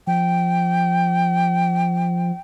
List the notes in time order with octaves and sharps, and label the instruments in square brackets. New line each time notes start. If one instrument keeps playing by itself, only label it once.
[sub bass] F3 [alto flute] G5